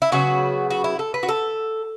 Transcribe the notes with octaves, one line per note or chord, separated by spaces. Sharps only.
E4
C#3 F#3 B3 F#4
F#4
E4
A4
B4
F#4
A4